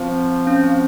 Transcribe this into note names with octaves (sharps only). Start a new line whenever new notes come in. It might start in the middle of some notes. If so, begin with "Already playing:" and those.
Already playing: F3 C4
C#4
C4